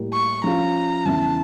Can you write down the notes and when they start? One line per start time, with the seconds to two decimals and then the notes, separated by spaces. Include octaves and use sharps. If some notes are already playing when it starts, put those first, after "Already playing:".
Already playing: A2 G3 A#3
0.13 C#6
0.44 F3 C#4 F4 A#5
1.05 E2 C#3 E3 A5